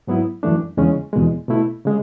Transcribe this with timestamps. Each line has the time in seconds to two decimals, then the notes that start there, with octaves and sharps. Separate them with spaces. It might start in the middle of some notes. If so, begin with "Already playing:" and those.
0.07 G#2 F#3 B3 E4
0.43 F#2 E3 A3 D4
0.77 E2 C#3 G#3 C#4
1.13 E2 B2 G#3
1.48 B2 A3 E4
1.85 C#3 G#3